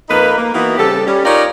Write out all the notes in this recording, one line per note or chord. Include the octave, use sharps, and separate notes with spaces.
F2 A#3 D#4 B4
A#3
E3 A#3 B3 D#4 E4 F#4
C#3 G3 C4 G4 A4
G3 C#4
D#4 F4 G4 A#4 C#5 D5